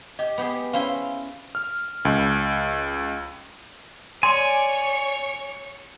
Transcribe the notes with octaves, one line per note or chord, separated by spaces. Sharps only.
G4 D#5
B3 G4 G#4
C#4 E4 C5 F5 G7
F6
C#2
C#5 D5 G#5 C6